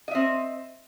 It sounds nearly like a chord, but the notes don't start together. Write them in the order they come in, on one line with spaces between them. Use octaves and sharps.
D#5 E5 C4